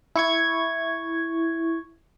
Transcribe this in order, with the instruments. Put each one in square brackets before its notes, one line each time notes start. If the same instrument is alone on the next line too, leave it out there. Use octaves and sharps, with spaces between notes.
[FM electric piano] E4 C#6 G#6